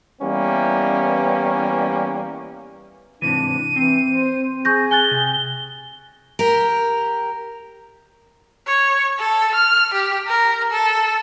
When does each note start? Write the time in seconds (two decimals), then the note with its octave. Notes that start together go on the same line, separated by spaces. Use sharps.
0.21 E3 G3 A#3 B3 C#4
3.22 G#2 C3 E3 D4 D#7
3.76 E3 C4
4.07 C5
4.65 G#4 C#6 G6 A#6
4.91 G#5 F#6 A6 G7
5.11 C3
6.39 G4 A#4
8.67 C#5
9.20 A4
9.55 F6
9.94 G4
10.27 A#4
10.72 A4